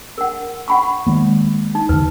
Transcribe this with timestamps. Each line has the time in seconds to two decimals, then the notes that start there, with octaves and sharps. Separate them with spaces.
0.18 A#4 F#5
0.68 F#5 B5 C#6
1.07 D#3 G#3 A#3
1.75 D#4
1.89 E2 D3 B4